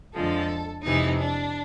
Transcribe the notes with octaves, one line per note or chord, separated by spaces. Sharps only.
F2 D3 F3 G#3 A4
F2 C3 E3 G#3 D#4
D4